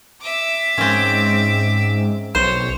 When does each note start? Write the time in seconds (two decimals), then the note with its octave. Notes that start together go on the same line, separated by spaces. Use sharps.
0.21 E5 D6
0.78 G#2 C4 C#4
2.35 B1 C5 C#5